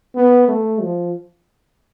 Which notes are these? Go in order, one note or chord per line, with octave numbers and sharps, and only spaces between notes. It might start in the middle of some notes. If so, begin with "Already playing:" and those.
B3
A3
F3